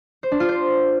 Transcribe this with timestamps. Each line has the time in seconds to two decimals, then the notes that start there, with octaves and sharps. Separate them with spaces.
0.23 C5
0.32 D4
0.40 F4
0.49 C5